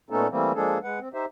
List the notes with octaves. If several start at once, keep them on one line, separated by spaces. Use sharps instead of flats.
A#2 A3 B3 C#4 D#4 A4
E3 G3 A3 A#3 C4
F3 G#3 A#3 D4 G#4 A4
G#3 B4 F#5
C4
D#4 G4 C5 E5